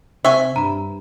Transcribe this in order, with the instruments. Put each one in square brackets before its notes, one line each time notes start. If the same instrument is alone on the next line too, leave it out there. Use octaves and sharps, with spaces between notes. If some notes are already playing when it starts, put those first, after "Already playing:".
[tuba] C3 [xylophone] C5 C#6 [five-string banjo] E5 G#5
[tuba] G2 [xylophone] A#5 B5